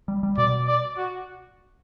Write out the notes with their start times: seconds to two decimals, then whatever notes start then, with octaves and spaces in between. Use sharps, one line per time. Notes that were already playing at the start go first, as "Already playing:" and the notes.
0.08 G3
0.23 G3
0.37 B2 D5
0.67 D5
0.97 F#4